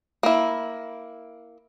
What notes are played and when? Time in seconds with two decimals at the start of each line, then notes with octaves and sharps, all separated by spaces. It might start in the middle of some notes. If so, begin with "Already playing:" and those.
0.23 A#3 E4